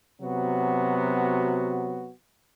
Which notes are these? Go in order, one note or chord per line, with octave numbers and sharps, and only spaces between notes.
C3 F#3 B3 F#4